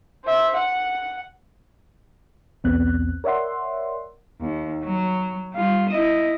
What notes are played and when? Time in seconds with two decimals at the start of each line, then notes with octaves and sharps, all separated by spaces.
0.25 C5 E5
0.56 F#5
2.64 B1 E2 B3 C4 F#6
3.24 A#4 C#5 D5 E5 F#5 C6
4.41 D#2
4.84 F#3
5.52 G3 F4
5.89 E4 D#5